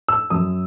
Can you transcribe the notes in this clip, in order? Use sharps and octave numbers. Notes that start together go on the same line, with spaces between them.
E6
F#2 D#6